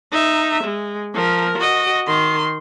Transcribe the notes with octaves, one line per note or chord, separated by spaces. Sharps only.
D#4 E5
G#3
F3 A#4
F#4 D#5
D#3 C6